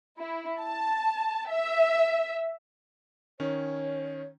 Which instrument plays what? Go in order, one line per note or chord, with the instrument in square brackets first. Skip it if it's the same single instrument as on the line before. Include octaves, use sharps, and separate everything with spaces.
[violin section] E4
A5
E5
[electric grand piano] D#3 C#4 [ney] C#5